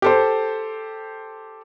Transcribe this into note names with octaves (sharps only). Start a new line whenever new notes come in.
G4 A4 C5